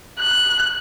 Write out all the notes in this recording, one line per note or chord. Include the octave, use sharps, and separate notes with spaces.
F#6